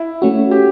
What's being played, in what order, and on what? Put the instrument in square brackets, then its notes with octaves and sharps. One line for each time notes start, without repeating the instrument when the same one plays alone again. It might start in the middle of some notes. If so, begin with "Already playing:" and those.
Already playing: [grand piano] E4
[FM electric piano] A3 C#4 F#4
[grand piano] G4